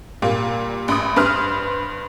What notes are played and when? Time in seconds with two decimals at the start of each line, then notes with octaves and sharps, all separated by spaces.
0.22 A#2 G3 A#3
0.88 A1 B5 D#6
1.16 G2 B4 C5 F6